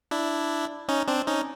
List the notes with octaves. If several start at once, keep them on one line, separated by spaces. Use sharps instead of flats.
D4 E4
C#4 D#4
C4 D4
C#4 D#4